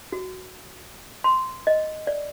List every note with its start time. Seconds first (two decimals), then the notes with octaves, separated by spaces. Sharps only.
0.12 F#4
1.24 C6
1.67 D#5
2.07 D5